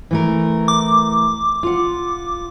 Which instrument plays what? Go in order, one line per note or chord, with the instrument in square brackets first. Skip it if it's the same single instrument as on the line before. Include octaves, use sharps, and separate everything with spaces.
[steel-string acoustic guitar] E3 A3 A#4
[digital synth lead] D6
[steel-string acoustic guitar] F4 F#5